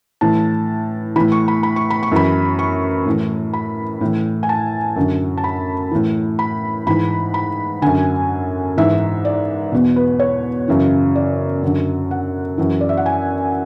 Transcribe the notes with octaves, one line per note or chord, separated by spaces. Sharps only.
A2 E3 A5
A2 E3 B5
C#6
B5
B5
C#6
B5
C#6
F#2 E3 B5
C#6
A2 E3
B5
A2 E3
G#5
A5
F#2 D3
A5
B5
A2 E3
B5
G#2 E3 B5
B5
F#2 D3 G#5
G#2 E3 E5
D5
E2 B2
B4
C#5
F#2 C#3 E3
D5
F#2 D3
F#5
F#2 E3
D5
E5
F#5
G#5